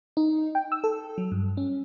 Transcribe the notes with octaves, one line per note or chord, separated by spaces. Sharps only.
D#4
G5
E6
A4
F#3
G2
C#4